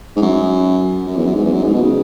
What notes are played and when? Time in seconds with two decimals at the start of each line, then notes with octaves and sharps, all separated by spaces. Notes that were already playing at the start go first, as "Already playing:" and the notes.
0.16 G#2
0.22 F#2
1.07 F#2
1.16 E2
1.26 F#2
1.35 G#2
1.45 E2
1.53 F#2
1.64 G#2
1.73 B2
1.82 C#3